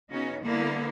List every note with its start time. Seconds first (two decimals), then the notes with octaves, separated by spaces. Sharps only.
0.12 C#3 B3 C#4 D#4 F#4
0.44 D3 G3 A#3 B3 E4